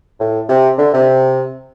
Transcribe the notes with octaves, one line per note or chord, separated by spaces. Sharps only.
A2
C3
D3
C3